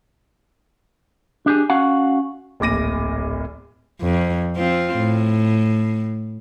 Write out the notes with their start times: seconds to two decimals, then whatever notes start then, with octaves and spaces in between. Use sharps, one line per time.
1.46 D4 G4 G#4
1.70 C#4 F#4 F5 F#5
2.60 D1 A#1 D6 A#6 D#7
4.01 F2
4.56 F3 C4 F4
4.96 A2